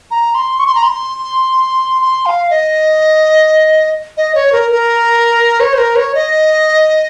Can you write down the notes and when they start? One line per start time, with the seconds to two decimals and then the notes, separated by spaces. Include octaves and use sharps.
0.11 A#5
0.35 C6
0.59 C#6
0.67 C6
0.75 A#5
0.83 C6
2.02 C6
2.26 F5
2.50 D#5
4.17 D#5
4.35 C#5
4.52 A#4
4.71 A#4
5.60 C#5
5.73 C5
5.78 A#4
5.96 C#5
6.15 D#5